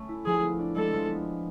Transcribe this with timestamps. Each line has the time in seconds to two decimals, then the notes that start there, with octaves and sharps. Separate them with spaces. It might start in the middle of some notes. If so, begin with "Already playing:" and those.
Already playing: A3 C#4
0.09 E4
0.26 F3 G#4
0.43 B3
0.59 D4
0.76 G#3 A4
0.93 F3
1.09 B3